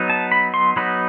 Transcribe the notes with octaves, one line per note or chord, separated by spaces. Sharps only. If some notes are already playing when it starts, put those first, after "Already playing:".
Already playing: F#3 B3 D#4
A5
B5
C6
F#3 B3 D#4 B5